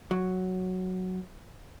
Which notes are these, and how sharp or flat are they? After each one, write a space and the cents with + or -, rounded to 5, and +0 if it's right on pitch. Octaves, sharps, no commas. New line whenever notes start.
F#3 +0